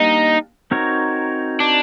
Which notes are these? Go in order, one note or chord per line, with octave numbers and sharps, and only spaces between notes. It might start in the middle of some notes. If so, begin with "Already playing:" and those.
Already playing: G3 A#3 D4 D#4
C4 D#4 F#4 A#4 C#5
D4